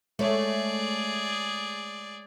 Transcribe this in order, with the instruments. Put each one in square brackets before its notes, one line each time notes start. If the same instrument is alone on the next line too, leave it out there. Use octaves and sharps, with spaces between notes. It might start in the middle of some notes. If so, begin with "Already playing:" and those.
[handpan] G#3 C#5 E5 [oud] A3 [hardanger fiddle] G#4 D5